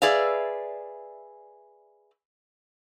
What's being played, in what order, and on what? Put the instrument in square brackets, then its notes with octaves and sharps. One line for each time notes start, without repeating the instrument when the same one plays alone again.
[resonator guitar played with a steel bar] G#4 B4 D5 E5 F5